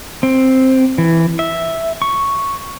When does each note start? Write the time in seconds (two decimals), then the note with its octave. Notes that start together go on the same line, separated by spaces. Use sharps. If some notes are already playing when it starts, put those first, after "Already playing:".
0.23 C4
0.98 E3
1.39 E5
2.02 C#6